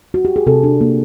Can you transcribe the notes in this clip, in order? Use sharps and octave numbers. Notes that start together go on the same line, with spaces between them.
F#4
G4
G#4
C3 A4
D4
A#3